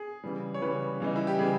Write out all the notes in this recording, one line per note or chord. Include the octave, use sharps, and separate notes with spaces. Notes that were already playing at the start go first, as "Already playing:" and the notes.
Already playing: G#4
C#3 E3 G3
C#5
C#3 E3 G3 B4
C#3 E3 G3 D#4
E4
G4
C#3 E3 G3 G#4